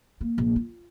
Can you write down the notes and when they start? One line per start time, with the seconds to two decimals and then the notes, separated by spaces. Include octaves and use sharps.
0.21 A#3
0.38 A#1
0.56 F4